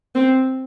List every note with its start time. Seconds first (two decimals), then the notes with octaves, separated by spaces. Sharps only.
0.15 C4